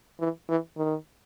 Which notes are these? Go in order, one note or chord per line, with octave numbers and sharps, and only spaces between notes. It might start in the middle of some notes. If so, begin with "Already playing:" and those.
E3
E3
D#3